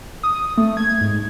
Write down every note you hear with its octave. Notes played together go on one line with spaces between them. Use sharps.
D#6
A3
G#6
G#2